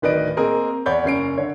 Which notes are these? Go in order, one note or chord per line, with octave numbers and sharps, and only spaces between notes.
D1 D#3 B4 D5 D#5 D7
A#3 C4 G#4 A#4 D#5
E2 C#5 D5 B5 G6
F#1 C#4 C7 D7
D3 C#5